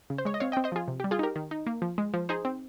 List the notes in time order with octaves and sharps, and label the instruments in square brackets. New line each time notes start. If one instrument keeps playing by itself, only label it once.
[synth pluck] C#3
C5
G#3 C#5
D#5
C4 C#5 F5
D#5 G5
C4
C5 D#5
F3 F4 G#4
C3
G4
G3
F4 G#4
D#4 G4 A#4
D#3
D#4
A#3
F3
G#3
F3
D#4 G#4 C5
C4